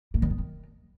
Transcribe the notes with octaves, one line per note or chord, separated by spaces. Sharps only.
A#3
D#3
B3
D#3